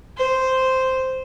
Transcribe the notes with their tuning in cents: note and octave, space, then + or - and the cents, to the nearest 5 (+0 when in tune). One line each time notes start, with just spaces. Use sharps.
C5 -5